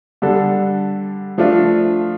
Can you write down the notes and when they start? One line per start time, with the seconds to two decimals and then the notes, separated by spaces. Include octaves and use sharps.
0.22 D3 G3 D4 A4
1.38 F3 A3 D4 F4